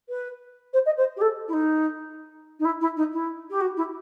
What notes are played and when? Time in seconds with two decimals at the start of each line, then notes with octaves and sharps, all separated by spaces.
0.09 B4
0.73 C5
0.85 D#5
0.97 C5
1.16 G4
1.21 A4
1.48 E4
1.53 D#4
2.59 D#4
2.65 E4
2.81 E4
2.96 D#4
3.12 E4
3.50 G4
3.60 F#4
3.76 E4